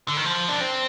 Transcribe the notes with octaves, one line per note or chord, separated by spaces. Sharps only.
D3
D#3
F3
D4
C4